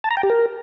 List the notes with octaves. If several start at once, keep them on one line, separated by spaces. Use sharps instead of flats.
A5
A#5
G5
G4
A#4